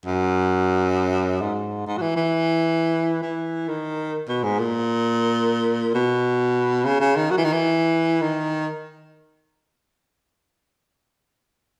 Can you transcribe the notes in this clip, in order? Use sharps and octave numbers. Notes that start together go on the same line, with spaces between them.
F#2
G#2
G#2
F#3
E3
E3
E3
D#3
B2
G#2
A#2
B2
C#3
C#3
D#3
F#3
E3
D#3
E3
D#3